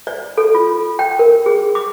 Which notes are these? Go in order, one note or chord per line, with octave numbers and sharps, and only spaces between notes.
D5
A4
F4
G5
A#4
G#4
D6